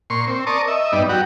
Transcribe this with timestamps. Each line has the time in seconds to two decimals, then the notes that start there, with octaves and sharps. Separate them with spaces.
0.10 A#2 C6 C#6
0.27 C4
0.47 A#4 D5 A5 C#6 D#6
0.68 D#5 E5
0.92 G2 B3 D#4 D5
1.09 F#3 F#4 G4